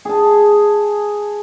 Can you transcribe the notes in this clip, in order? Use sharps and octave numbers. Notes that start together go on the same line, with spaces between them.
G#4 A5